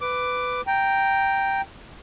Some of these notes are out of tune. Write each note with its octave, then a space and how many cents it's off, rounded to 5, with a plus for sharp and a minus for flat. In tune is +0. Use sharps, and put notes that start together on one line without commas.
B4 +15 D6 +0
G5 +0 A#5 -5